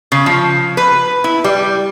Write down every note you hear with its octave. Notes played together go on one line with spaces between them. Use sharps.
C#3
F3
B4
E4
G3